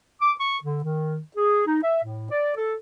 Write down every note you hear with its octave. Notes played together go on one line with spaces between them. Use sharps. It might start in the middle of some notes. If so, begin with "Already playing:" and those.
D6
C#6
D3
D#3
G#4
D#4
E5
A2
D5
A4